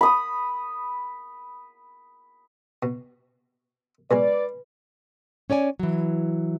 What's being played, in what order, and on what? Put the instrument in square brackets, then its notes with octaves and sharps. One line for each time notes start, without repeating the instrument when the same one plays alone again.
[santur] B5 D#6
[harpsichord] B2
[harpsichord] B2 G#3 G#5 [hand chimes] B4 [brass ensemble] D5
[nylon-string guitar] C#4 C#5 D5 G#5
E3 F#3